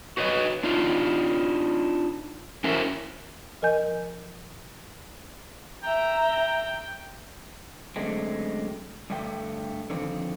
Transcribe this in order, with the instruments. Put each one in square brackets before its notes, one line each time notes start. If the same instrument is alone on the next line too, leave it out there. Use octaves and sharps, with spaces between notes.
[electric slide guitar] F#4 B4 C#5 D#5
D4 D#4 F4
C#4 E4 F#4 A#4 C5 E5
[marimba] F3 A#4 D#5 G#5 G6
[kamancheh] E5 A#5 [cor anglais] G5
[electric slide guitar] F#2 D3 G#3 A3 C4
G2 D3 A3 G5
D3 D#3 F3 C4